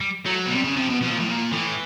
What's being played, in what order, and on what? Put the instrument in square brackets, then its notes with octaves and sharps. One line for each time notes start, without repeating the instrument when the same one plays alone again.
[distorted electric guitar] G3
[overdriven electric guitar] F#3 [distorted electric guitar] A3
[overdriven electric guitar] B2
[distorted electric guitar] G3
[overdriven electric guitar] C3
C#3
[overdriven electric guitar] C3 [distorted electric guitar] F3
[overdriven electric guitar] B2
[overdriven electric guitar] B2 [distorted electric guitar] F3
[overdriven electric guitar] A#2
A2
A#2
[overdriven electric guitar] A2 [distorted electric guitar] E3